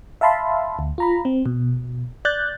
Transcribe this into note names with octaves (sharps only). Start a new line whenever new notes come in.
E5 F5 A5 B5 C6
D2
F4 A#5 B5
C4
B2
D5 F#6 G6 A6